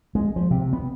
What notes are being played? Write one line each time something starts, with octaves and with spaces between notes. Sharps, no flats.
G#3
F3
C3
B3